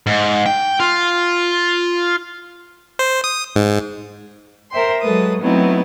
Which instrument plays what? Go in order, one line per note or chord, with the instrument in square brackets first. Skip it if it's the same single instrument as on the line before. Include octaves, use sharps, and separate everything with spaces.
[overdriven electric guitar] G#2
G5
F4
[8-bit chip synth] C5
D#6
G#2
[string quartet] A#4 C5 E5 G5 C6
F#3 G#3 A4 B4 D#6
F#3 A3 B3 C4 D#4 E4